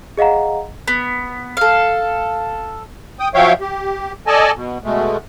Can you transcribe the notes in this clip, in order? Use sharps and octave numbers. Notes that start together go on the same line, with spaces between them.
G#4 D#5 F5 F#5 A#5
B3
A4 F5
G5 D#6
F3 F#3 C#5 E5 F5 G5
G4
A4 D5 D#5 G#5 A5
B2
B2 G#3 A3